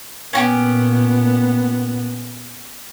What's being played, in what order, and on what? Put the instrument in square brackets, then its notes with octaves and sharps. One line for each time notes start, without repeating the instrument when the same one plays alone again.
[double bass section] A#2 [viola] B3 [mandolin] C#4 F#4 G4